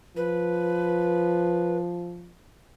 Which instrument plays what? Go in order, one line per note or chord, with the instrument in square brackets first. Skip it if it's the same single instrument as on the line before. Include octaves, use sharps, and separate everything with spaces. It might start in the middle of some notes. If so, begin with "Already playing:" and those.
[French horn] F3 [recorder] B4